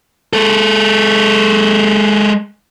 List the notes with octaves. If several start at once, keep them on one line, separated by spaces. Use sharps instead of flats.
G#3 A4